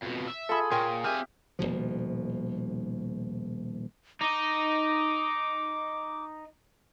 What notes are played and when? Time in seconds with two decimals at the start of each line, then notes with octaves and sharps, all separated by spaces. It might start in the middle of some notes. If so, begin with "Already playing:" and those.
0.03 F2 B2
0.28 E5
0.49 F4 G#4 A4 B5
0.71 A#2 A#4 C#5 G5 G#5 C6
1.04 C4 G4 E5 G#5 F6
1.59 D#1 C#2 B2 F3
4.21 D#4 D6